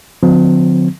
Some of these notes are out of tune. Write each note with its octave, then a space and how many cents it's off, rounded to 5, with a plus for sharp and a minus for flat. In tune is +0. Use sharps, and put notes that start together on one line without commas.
D3 +0 F3 +40 C4 -40